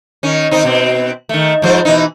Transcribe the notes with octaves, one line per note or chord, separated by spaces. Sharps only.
D#3 C#4
D#3 C4 D#4
B2 C4
D#3 A3
G#2 F3 C5
B2 E3 D#4